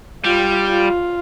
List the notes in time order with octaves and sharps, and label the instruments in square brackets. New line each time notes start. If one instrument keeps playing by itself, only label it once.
[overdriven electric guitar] G3 [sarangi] F4
[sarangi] F4